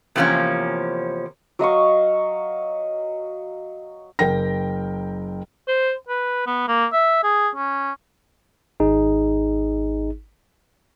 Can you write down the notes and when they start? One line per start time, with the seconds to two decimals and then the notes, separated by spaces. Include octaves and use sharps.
0.16 E2 C3 F3 G#3 A#3 C#4
1.59 F#3 D#5 F5 C#6
4.19 F#1 A#4 G5 A#6
5.68 C5
6.09 B4
6.47 B3
6.68 A#3
6.93 E5
7.23 G#4
7.55 C#4
8.80 G#1 D#4 G#4